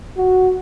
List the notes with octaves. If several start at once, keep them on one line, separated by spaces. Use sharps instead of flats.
F#4